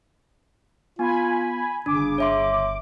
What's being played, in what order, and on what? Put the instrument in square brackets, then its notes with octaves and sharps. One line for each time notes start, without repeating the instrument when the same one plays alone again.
[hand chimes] B3 [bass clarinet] F4 [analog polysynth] G#5 B5
[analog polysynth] G1 D6 [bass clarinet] C#3 [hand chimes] D4
[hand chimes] C#5 E5 C6